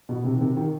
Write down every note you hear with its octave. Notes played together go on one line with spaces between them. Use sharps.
B2
C3
D#3
C3
D#3